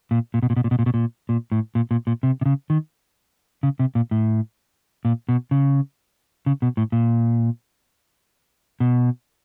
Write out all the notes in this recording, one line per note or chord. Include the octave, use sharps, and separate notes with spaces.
A#2
A#2
B2
A#2
B2
A#2
B2
A#2
B2
A#2
A#2
A2
A#2
A#2
A#2
C3
C3
C#3
D#3
C#3
C3
A#2
A2
A#2
B2
C#3
C#3
B2
A2
A#2
B2